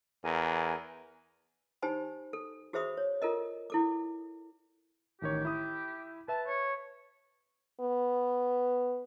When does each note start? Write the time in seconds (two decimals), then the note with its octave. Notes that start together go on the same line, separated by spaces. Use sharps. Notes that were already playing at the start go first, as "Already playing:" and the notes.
0.24 E2 A#4 G#5
1.82 D#4 G4 C5 G#5 B5
2.33 A4
2.73 F#4 G#4 C5 E5 B5 D#6
2.97 C#5
3.22 F4 A4 A#4 D#5
3.70 E4 A4 D6
5.22 A1 D#3 G4 C#5
5.45 E4 D#6
6.28 B4 E5 A5
6.47 C#5
7.80 B3